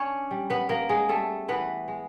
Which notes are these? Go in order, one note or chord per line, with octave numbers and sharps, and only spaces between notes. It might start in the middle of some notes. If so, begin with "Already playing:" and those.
Already playing: C#4 D4 C#5
G3
B3 B4
A#3 B3 A#4
G#3 G#4
G3 A3 A4
E3 B3 B4
G#3